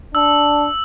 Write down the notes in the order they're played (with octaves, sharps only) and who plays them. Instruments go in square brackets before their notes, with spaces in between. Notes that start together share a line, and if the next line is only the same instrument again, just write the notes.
[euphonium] D4 [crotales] E6